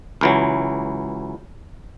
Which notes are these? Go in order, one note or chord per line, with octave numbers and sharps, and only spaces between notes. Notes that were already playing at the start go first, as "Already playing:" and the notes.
C#2 E3 F#3